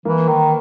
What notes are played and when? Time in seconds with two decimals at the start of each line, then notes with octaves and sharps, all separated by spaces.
0.05 E3 A#3
0.28 D#3